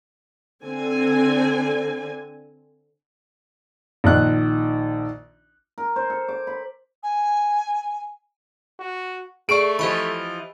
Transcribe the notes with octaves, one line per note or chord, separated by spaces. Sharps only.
D3 C4 G#5
A#1 D#3 D#5 F#6
A#4
C5
A4
D6
B5
G#5
F#4
A3 G#4 D5 C#6 D7
E3 F3 G4 D#5 B5